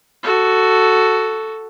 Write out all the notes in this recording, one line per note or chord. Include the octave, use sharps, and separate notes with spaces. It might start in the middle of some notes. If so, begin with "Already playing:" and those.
F#4 A4